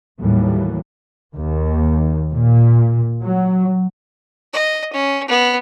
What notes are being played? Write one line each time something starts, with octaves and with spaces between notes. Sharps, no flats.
D#2 A2 E3 F#3 G3
D#2
A#2
F#3
D#5
C#4
B3